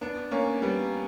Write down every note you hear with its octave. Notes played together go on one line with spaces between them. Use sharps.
B3 D4
A#3 C#4
G3 B3